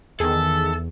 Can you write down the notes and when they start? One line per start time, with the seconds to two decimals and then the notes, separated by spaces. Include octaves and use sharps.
0.20 E2 D#3 G#4 A4 E5